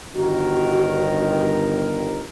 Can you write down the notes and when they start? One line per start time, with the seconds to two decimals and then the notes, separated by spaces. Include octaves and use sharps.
0.15 G1 D#3 F#4 A#4